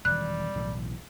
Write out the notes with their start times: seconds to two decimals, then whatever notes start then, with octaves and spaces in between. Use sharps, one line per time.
0.05 E1 D#3 G3 F#6
0.55 B1 A2 E3